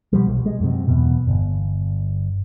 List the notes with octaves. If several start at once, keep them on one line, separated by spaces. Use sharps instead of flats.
B2 F3 G3
B1
G#3
F#2 C3
E2 B2
G1